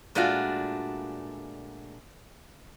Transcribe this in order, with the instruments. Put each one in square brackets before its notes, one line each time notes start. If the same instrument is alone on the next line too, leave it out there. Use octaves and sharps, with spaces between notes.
[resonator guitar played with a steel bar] A#2 G#3 A3 D4 F4 F#4